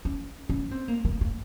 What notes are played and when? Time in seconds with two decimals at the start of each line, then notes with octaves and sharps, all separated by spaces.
0.05 C#4
0.49 C#4
0.71 C4
0.88 A#3
1.05 A#3
1.21 A#3